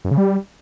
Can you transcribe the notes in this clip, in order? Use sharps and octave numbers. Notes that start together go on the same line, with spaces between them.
F#2
C#3
G3